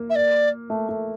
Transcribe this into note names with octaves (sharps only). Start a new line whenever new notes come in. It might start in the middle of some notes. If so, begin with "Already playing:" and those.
Already playing: A#3
E5
D5
A3
A3